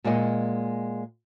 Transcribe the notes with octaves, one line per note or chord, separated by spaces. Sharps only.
A#2 G#3 A#3 D5 D#5 F#5